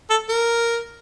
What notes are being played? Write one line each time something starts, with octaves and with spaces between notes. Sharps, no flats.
A4
A#4